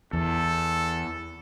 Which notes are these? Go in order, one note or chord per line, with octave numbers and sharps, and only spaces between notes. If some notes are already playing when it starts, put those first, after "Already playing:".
E2 A4